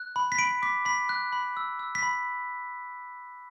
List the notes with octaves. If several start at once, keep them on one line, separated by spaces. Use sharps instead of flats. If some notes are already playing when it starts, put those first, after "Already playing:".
Already playing: F#6
B5
B6
B5 D7
D6 B6
B5 B6
F#6
B5
E6
E6
B6
B5